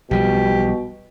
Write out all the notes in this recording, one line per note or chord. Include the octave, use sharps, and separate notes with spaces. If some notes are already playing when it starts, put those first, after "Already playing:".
B1 B2 F3 G3 G4